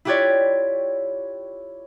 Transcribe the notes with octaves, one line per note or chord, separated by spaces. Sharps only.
E4 F4 G4 B4 C#5 D5